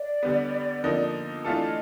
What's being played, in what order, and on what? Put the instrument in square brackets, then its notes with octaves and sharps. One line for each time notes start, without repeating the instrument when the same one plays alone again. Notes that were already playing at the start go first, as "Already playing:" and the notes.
Already playing: [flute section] D5
[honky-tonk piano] D3 G3 B3
D3 F3 A#3 D#4
[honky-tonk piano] E3 A3 D4 F4 A4 [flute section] D#5